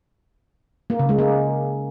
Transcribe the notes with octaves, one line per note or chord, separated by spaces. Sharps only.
A#3
C#3
G#3
A#3